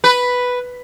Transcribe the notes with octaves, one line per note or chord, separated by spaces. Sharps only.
B4